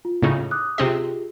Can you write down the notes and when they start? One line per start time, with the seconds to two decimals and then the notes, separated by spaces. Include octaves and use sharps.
0.05 F4
0.22 A2 C#3 D#4
0.51 D6 D#6 F#6
0.78 C3 C4 F4 G4 G#4 D#5